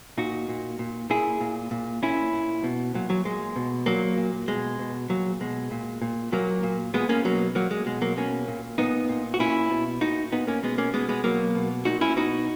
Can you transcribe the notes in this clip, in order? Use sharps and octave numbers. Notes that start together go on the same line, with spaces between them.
A#2 D#4 F#4
A#2
A#2
A#2 E4 G#4
A#2
A#2
A#2 C#4 E4
A#2
B2
A#2 F#3
F#3
A#2 G#3
B2
A#2 F#3 A#3
A#2
B2 G#3
B2
A#2 F#3
B2 G#3
A#2
A#2
A#2 F#3 A#3
A#2
A#2 G#3 B3
A#3 C#4
B2 F#3 A#3
A#2 F#3 A#3
G#3
B2 G#3
F#3 A#3
B2 A#3 C#4
A#2
A#2 B3 D#4
A#2
F#4
A#2 C#4 E4
B2
A#2 D#4 F#4
A#2 B3 D#4
A#3 C#4
B2 G#3 B3
A#3 C#4
B2 G#3 B3
G#3 B3
B2 F#3 A#3
B2
A#2 D#4 F#4
C#4 E4
B2 D#4 F#4